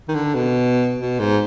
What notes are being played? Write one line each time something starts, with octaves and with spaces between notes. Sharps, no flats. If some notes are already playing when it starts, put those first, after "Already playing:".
D#3
D3
B2
B2
G#2